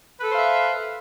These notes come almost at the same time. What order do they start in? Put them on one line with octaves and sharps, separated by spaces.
B4 A4 C5 F5 E5